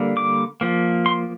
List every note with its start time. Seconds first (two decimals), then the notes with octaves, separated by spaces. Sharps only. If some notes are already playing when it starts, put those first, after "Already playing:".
Already playing: D3 G3 A#3
0.17 D6
0.61 F3 A#3
1.06 C6